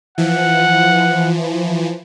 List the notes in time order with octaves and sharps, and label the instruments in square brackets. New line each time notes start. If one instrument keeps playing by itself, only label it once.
[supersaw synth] E3 F3 [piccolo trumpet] F#5